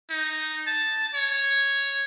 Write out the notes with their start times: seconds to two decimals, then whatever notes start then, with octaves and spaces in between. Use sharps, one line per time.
0.10 D#4
0.67 A5
1.15 C#5